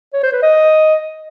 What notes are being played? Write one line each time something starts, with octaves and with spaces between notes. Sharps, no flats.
C#5
C5
B4
D#5